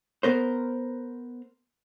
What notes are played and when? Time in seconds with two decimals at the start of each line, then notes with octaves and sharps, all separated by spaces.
0.23 B3 A#4 C5